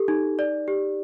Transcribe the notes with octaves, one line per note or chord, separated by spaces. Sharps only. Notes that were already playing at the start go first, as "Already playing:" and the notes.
Already playing: G4 A4
D#4
D5
G4